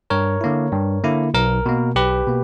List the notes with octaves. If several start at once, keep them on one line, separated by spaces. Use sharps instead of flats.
G2 A#4 C#5
D3 A#3 E4
G2
D3 A#3 E4
B1 A#4
B2 A#3
B1 G4 B4
B2 A#3